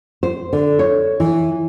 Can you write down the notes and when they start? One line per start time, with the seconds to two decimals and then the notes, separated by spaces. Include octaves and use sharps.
0.23 C5
0.53 D3
0.79 C#5
1.20 E3